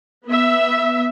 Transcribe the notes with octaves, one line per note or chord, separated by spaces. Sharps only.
B3 E5